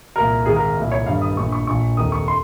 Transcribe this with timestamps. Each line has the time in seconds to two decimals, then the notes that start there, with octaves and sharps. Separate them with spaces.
0.16 C2 A#2 A#4
0.46 G#1 G#2 D#3 G#4
0.56 A#4
0.77 C2 A#2
0.92 C#5
1.06 G1 G2 D#3 F5
1.22 D#6
1.37 A#1 A#2 C#6
1.52 C#6
1.67 A#1 A#2 C#6
1.97 F1 D#2 D#3 D#6
2.12 C#6
2.28 C6